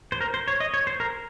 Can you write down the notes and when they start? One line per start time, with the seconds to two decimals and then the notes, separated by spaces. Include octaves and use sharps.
0.12 C5
0.21 A#4
0.34 C5
0.48 C#5
0.60 D#5
0.74 C#5
0.87 C5
1.00 A#4